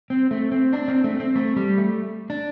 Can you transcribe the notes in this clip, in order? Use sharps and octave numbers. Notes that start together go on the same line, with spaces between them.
C4
A3
C4
D4
C4
A3
C4
A3
G3
A3
D4